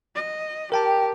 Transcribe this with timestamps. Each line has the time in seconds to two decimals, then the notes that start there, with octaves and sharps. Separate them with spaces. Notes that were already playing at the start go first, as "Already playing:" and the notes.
0.16 D#5
0.72 G4 A#4 G5 A5